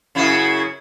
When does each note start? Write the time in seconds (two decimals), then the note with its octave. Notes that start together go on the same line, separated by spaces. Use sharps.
0.15 F#2 C#3 E4